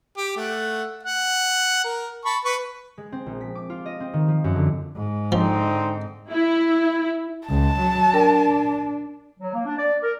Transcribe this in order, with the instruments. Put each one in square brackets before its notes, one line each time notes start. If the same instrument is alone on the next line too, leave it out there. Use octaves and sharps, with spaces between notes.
[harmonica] G4
A3 F#5
F#5
A#4
A5 B5 C#6
B4 C#6
[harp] G#3
C4
A#1
B6
D6
F4
D#5
C4
D#3
F3
F#2
D3
[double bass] G#2
[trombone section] D3 C4 D#4 [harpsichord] F3
[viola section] E4
[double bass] C#2 [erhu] A5
[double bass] F#3
[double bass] D4 [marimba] A#4 G5
[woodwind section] F#3
A#3
D4
D5
A#4